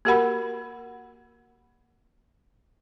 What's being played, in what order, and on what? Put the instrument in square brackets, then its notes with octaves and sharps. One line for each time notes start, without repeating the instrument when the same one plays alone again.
[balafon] A#3 F#4 G4 A#4 F#5 B5